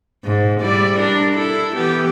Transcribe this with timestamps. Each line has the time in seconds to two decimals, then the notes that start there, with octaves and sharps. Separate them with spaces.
0.24 G#2
0.60 G3 E4 D5
0.99 D4 A#4
1.36 E4 A4
1.75 E3 B3 G4